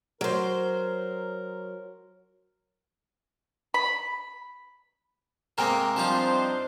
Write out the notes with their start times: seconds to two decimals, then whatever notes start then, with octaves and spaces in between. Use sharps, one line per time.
0.21 F#3 A#4 C5
3.74 B5
5.58 C3 G#3 A#3 A#4 G5
5.97 F3 G3 C4 D4 D#4 F4 C5